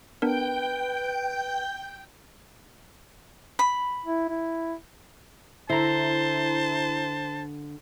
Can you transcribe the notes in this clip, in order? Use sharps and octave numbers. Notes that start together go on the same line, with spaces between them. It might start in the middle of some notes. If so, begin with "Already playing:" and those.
B3 D4 A#4 B4 G5 G6
B5
E4
E4
D3 E4 C5 A5 A#5